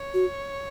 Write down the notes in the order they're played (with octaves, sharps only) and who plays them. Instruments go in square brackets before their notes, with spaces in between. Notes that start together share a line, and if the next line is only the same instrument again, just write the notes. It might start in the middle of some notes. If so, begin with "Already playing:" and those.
Already playing: [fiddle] C#5
[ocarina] F#4